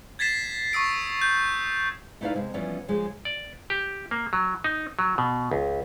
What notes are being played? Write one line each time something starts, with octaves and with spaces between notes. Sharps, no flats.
G#6 A6 B6 C7 E7
C#6 D#6 E6 D7
G6
A3 D#4 E4 B4 D5 F5
C3 G#3 B3
E3 F3 G3 B3 C#4 D4
C#3 F3 G#3
D5
G4
A#3
F#3
D#4
F#3
B2
C#2